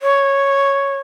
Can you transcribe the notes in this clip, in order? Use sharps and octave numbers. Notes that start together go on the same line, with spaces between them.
C#5